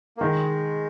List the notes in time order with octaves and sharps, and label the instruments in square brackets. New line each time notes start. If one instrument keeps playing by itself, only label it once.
[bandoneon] A#3
[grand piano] D#3 [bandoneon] G#3